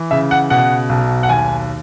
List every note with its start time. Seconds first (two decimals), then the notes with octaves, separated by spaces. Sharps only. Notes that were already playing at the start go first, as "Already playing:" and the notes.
Already playing: E3
0.11 C#3 E5
0.31 F#5
0.50 B2 F#5
0.89 B1
1.23 F#5
1.29 D#2 G#5